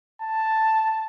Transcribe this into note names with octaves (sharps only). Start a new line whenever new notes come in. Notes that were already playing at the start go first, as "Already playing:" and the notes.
A5